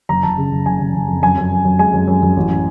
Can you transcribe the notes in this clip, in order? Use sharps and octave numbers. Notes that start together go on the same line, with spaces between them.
F#1 A#5
F#1 A5
C#3
F#1
F#1 G#5
F#1
F#1
F2
F#2 G#5
F#2
F#2
F#2
G#3 G#5
F#2
F#2
F#2
A1